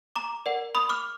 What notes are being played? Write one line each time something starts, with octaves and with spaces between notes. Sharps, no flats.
A#5 D6
A#4 D5 F#5
B5 D#6
D6 F6